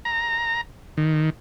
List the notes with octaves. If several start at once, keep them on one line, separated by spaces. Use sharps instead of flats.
A#5
D#3